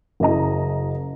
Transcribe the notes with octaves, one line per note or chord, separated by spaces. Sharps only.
F#1 E4 D#5 A#5